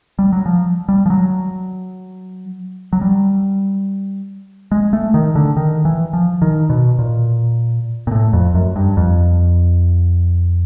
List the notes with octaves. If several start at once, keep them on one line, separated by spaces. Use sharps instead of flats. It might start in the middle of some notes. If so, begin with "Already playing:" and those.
G3
F#3
F3
G3
F3
F#3
F#3
G3
G#3
A3
D#3
D3
D#3
E3
F3
D#3
B2
A#2
A#2
A2
F2
F#2
G2
F2